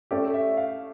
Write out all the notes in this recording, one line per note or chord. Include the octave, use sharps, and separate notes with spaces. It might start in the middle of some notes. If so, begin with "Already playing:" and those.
A3 C#4 G4 D5
E5
F5